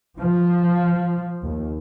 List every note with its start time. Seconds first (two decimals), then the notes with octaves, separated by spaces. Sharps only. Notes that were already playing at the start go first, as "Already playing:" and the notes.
0.20 F3
1.44 D#2